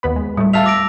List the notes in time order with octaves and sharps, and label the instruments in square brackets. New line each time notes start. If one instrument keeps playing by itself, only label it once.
[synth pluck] D#2 B3 B5
G#3
[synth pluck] A2 A3 [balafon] G3
[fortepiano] E5 F5 A5 [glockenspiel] E6 F7
[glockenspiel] D6 A#6 D7